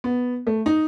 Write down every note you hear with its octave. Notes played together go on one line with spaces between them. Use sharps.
B3
A3
D#4